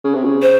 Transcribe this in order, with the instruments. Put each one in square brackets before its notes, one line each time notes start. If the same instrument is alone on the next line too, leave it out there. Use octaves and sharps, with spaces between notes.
[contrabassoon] C#3
C3
C#3
[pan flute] C5